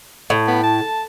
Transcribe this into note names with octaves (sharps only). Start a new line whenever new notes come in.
A2
B3
A5